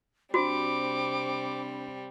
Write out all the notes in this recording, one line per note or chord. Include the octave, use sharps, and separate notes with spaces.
C3 G3 C4 D4 F#4 C5 B5 D6